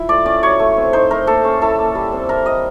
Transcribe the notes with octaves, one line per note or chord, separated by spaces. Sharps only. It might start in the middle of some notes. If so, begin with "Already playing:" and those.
Already playing: E4 F4
A3 D5
C#4 D5
F#3 C#5
A3
C4
D#4 C5
A3 A#4
A#3 A4
C#4
E4 A4
A#3
G3
C4
E4 A#4
G3 D#5